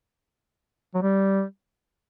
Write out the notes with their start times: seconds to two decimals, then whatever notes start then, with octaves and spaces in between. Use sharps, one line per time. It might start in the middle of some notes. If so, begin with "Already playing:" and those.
0.94 F#3
1.02 G3